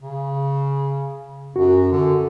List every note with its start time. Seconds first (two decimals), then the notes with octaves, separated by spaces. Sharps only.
0.01 C#3
1.56 F#2 F#4
1.92 D3